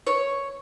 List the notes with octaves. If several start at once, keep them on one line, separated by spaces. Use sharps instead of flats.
C#5